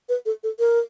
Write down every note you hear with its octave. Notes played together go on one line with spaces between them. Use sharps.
B4
A4
A4
A#4